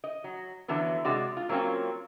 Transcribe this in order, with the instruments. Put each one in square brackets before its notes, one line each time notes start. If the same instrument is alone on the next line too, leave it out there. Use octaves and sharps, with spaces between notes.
[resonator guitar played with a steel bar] D#5
F#3
D3 E3 F#3 B3
C3 G#3 F#4 D5
F4
F#3 A#3 C4 C#4 F4